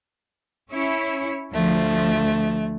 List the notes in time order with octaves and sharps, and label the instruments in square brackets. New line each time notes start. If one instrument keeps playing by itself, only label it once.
[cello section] C#4 E4 C#5
[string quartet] D2 A3 [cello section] F3